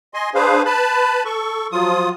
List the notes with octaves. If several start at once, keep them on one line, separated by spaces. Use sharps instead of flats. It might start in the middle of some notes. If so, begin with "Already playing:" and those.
D#5 G#5 C6
D4 G#4 B4 C5 F5
B4 A5 B5
A4 C#6
F3 F#3 F4 D#6